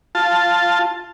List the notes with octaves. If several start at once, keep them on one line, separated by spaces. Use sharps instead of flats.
F4 A5